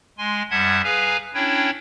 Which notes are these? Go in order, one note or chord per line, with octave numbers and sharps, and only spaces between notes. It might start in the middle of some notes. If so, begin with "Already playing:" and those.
G#3 G#5 C6
F#2 G3 E5 F#5 A5 G#6
G#4 B4 F5 G#5 A#5
C#4 D4 E4 C#5 G5